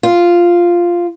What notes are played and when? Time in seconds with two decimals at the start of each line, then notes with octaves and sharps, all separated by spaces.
0.03 F4